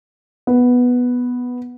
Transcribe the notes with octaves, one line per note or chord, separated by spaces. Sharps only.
B3